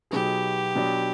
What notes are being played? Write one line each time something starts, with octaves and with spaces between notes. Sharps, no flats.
B2 F#3 B3 D#4 G4 G#4
B2 F#3 B3 D4